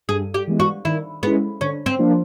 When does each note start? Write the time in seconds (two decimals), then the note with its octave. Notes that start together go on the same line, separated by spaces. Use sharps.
0.09 G2 G#4
0.34 G4
0.48 E3 G#3 B3
0.60 F#4
0.85 D#3 E4
1.23 G#3 B3 C#4 E4
1.61 D3 C#4
1.86 C4
1.99 F3 A#3 D4 F4